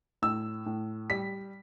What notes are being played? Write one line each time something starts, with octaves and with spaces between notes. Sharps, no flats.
A2 E6
A2
G3 B6